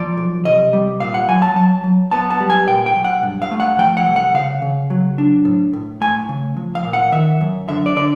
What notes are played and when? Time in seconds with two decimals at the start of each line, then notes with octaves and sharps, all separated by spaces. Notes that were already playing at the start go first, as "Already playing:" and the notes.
Already playing: F3 D5
0.17 B1
0.45 C3 D#5
0.73 G3
1.00 A#2 F5
1.14 F#5
1.28 F#3 G#5
1.42 A5
1.56 F#3 A5
1.84 F#3
2.11 B3 A5
2.30 A5
2.40 G3
2.50 G#5
2.68 A#2 G5
2.86 G5
2.95 B1
3.04 F#5
3.23 G2
3.42 F5
3.51 A3
3.60 F#5
3.78 F3 G5
3.97 F#5
4.06 C2
4.16 F#5
4.34 C#3 F5
4.62 C#3
4.90 F#3
5.18 D4
5.45 A2
5.73 A2
6.01 A3 G#5
6.29 C#3
6.57 F3
6.75 F5
6.85 A#2
6.93 F#5
7.12 D#3 E5
7.41 F#2
7.68 D3 E5
7.86 D5
7.96 D3 D5